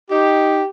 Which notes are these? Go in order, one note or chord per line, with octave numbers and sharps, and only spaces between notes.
D#4 G4